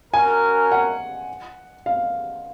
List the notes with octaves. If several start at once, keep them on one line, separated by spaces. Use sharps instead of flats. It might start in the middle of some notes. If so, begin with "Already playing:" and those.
C#4 F#4 A#4 G#5
F#5
F5